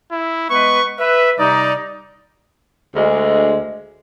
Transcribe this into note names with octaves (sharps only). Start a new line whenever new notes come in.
E4
G#3 B3 B4 C#6
B4 E5
C3 G3 D#4 D5
D2 G#3